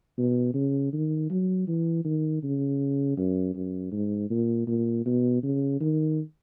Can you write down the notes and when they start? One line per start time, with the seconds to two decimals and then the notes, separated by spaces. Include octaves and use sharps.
0.18 B2
0.54 C#3
0.93 D#3
1.30 F#3
1.67 E3
2.05 D#3
2.43 C#3
3.17 F#2
3.55 F#2
3.92 G#2
4.30 A#2
4.67 A#2
5.06 B2
5.43 C#3
5.80 D#3